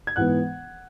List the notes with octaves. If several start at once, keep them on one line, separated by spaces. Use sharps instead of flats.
G#6
G#2 E3 B3 F#5 F#6